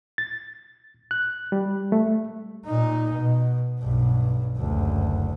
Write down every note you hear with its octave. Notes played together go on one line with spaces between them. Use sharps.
A6
F#6
G3
A3
A#2 D#4
B2
B1 G2
F#1 D2